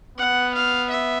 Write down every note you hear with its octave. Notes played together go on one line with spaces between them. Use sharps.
B3 F#5
F5
E5